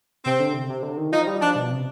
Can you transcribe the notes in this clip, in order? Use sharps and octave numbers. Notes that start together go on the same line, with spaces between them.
C3 C4
D3
C3
C3
D3
D#3
F3 D#4
G3
F3 D4
B2
C3